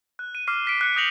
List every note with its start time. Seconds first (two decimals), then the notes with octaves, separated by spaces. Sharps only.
0.19 F#6
0.35 D#7
0.47 D6 F6 C7
0.67 B6 D7
0.81 F#6 C#7
0.96 D#6 G6 A#6 C#7 F7 F#7